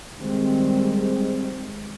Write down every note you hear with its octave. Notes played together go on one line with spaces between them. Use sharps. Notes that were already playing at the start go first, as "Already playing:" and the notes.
D#3 G3 G#3 C4